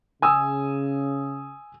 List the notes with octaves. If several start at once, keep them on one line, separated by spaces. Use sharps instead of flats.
C#3 G#5 D#6 E6